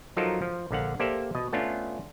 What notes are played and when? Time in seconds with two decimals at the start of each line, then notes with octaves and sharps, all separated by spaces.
0.17 F3 F#3 D#4 F4 A4 A#4
0.42 F3
0.71 A#1 D3 F5 F#5
1.00 A#3 G4 A4 C5 D5 E5
1.35 B2 D#5
1.53 A3 B3 C#4 D4 F4